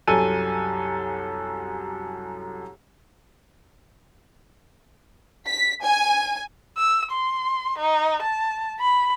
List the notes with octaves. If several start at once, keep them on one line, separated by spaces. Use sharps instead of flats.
C2 F#2 A4 G#5 D#7
B6
G#5
E6
C6
D#4
A5
B5